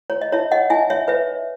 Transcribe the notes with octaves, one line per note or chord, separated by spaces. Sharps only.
C#5
D#5
D#4 C#5 E5
D#5 F#5
D#4 E5 G#5
C#5 E5
B4 C#5 E5